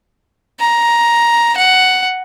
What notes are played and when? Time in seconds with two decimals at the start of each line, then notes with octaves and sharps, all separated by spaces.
0.60 A#5
1.57 F#5